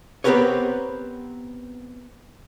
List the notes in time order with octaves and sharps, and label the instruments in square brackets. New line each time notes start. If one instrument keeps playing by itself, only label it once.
[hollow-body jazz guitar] B3 C4 G4 A#4 B4 C#5